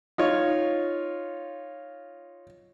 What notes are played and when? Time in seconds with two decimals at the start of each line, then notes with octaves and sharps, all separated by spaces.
0.18 D#4 F4 C#5